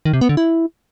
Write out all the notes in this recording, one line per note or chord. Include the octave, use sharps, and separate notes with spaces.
D#3
C3
B3
D3
E4